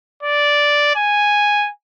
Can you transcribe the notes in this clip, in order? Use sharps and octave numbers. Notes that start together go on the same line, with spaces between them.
D5
G#5